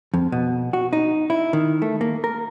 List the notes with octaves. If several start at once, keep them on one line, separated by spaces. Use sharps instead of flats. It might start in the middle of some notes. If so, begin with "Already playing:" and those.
F2
B2
F#4
D#4
E4
D#3
A3
A#3
A#4